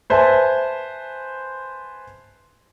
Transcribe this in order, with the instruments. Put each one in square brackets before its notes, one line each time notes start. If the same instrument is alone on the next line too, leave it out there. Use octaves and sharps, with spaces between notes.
[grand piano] B4 C5 E5 G#5 A5